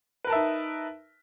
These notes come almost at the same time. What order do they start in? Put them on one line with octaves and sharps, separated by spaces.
B4 A#4 A5 E5 D#4